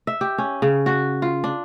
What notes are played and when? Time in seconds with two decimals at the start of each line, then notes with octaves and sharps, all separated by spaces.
0.07 E5
0.21 G4
0.38 C#4
0.62 C#3
0.86 F#4
1.22 F4
1.44 D4